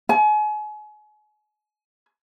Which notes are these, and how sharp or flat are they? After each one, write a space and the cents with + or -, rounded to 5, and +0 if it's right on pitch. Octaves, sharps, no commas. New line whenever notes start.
G#5 +35